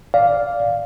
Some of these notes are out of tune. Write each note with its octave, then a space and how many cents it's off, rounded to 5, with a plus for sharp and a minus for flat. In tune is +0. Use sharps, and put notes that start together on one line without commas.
D5 -10 F5 +0